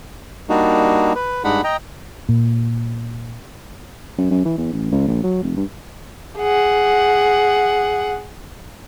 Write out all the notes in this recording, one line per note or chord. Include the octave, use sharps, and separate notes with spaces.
G3 A#3 D4 D#4 F#4
B4
G2 G#3 D4 D#4 F#5 B5
D#5 G5 A#5
A#2
F#2
F#2
E3
E2
A1
C#2
A#1
F#3
F1
G2
G#4 F#5